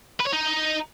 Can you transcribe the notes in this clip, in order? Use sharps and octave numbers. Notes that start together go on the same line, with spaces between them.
B4
C#5
D#4